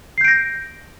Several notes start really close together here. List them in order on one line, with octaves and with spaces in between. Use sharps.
C7 G6 D7 A#6